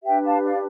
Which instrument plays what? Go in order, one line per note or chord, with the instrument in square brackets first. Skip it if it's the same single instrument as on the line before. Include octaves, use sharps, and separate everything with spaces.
[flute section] D4 G4 B4 E5 G5
F5 A5
D5 F5